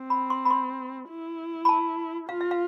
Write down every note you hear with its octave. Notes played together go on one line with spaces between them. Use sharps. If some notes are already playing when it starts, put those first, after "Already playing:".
Already playing: C4
B5
C6
B5
C6
E4
B5
A5
F4 F5
E5
F5